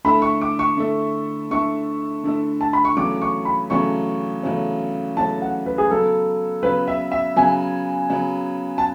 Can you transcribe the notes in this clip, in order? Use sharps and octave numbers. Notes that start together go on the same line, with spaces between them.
D3 A3 E4 A4 E5 B5
C#6
D6
C#6
D3 A3 E4 A4 E5
D3 A3 E4 A4 E5 C#6
D3 A3 E4 A4 E5
A5
B5
C#6
E2 C#3 F#3 A3 C#4 D6
C#6
B5
E2 C#3 F#3 A3 C#4 C#6
E2 C#3 F#3 A3 C#4
E2 C#3 F#3 A3 C#4 A5
F#5
B4
G#4
C#3 F#3 B3 A4
C#3 F#3 B3 B4
E5
E5
C#3 F#3 B3 G#5
C#3 F#3 B3
A5